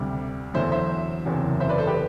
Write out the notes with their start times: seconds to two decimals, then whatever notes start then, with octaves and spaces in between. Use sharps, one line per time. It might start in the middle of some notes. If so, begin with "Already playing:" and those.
Already playing: D2 C3 G3
0.54 E2 D3 F#3 C5 E5
0.72 C5 E5
1.25 F#1 E2 C3 F#3
1.60 C5 E5
1.69 B4 D5
1.78 A4 C5
1.87 G4 B4